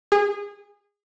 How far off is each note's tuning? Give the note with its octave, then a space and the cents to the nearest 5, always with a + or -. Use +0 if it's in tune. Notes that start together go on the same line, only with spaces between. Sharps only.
G#4 -25